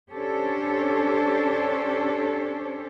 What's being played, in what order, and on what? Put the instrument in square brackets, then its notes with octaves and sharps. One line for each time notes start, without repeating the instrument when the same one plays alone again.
[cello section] C#4 D4 G4 A4 C5 C#5